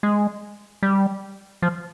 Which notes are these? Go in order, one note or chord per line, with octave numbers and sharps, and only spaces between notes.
G#3
G3
F3